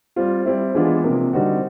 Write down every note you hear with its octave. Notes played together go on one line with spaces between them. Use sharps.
G3 C4 F4
G3 C4 E4
E3 G#3 B3 D4 F4
C3 F3 A#3 D4
D3 G3 C4 D#4 F#4